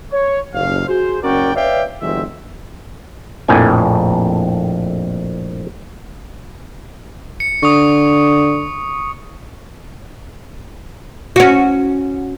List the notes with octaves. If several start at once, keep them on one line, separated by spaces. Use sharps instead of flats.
C#5
F#1 D#2 F5
F#4 G#4 C5
F#1 C#4 F#4 A#4 D5 G5
B4 C#5 D5 E5 F5 G5
G1 E3 F#3 G#3 C4 E5
A#1 F2 A2 G#5
C#7
D3 C#6 D#6
C#4 F#4